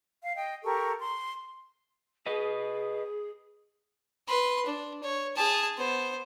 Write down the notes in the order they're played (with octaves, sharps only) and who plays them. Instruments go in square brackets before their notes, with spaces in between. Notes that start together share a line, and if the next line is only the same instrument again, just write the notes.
[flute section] F5
D#5 G5
G4 A4 A#4 C#6
C6
[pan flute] G#4 [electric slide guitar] B4 D#5
[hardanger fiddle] B4 C6
D4
C#5
G#4 A5
B3 C5